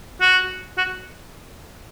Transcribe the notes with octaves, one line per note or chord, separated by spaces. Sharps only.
F#4
F#4